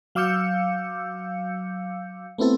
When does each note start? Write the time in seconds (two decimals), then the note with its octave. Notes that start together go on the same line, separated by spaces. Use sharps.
0.15 F#3 F5 D6 E6 G6 C#7
2.38 A3 B3 C4 E4 A4